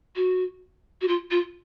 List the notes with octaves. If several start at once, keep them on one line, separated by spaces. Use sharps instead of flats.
F#4
F#4
F4
F4